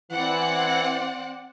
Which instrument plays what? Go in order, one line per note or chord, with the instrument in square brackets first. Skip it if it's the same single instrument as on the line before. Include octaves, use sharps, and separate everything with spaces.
[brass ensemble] E3 [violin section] C4 D5 F#5